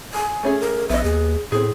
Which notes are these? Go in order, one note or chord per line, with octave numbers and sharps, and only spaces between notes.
G#5
A3 C#4 G#4
A#4
A#1 B3 D#5 E5
D#2 G#4
A2 C4 G#4 A4